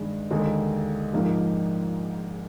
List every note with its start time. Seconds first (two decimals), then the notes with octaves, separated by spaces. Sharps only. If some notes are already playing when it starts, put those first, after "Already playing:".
Already playing: G2 D#3 G#3 D4
0.31 D#2 D3 G#3
1.13 A#1 G#2 F3 A#3 D#4